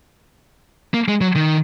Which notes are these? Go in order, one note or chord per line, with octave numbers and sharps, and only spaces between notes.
A#3
G#3
F#3
D#3